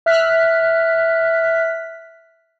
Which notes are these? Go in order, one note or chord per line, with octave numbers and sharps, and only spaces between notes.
E5 F6 F#6 B6